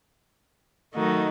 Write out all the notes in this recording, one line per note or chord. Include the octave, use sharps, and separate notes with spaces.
D#3 F#3 A3 D#4 F#4